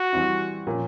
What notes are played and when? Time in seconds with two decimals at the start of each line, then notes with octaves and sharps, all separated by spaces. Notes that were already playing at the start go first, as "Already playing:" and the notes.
Already playing: F#4
0.13 E3 G3 C4 E4
0.67 A#2 F3 A#3 C#4